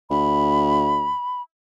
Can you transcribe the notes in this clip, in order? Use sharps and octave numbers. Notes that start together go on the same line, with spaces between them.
D2 B5